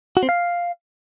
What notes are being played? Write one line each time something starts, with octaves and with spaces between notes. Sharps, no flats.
F#4
C4
F5